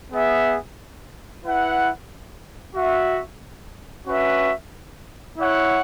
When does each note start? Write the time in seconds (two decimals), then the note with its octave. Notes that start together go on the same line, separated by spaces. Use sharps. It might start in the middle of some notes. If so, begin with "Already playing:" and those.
0.11 B3 G#4 E5
1.44 E4 B4 F#5
2.75 F#4 E5
4.07 C#4 F#4 B4 E5
5.37 E4 C#5 F#5